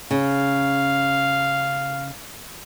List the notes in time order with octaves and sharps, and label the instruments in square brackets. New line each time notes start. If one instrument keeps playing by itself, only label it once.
[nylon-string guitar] C#3 [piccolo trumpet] F5